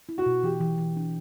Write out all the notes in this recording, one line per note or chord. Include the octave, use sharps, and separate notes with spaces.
E4
F#4
B2
E3 G4
E3
E3
D4